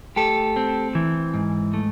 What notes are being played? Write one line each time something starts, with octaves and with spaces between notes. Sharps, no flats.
A3 G4 A4
C4
E3
G#2
A3